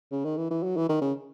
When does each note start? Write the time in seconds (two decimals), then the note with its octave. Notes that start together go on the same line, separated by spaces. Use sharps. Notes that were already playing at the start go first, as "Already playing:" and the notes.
0.11 C#3
0.25 D#3
0.37 E3
0.51 E3
0.63 F#3
0.76 E3
0.89 D#3
1.01 C#3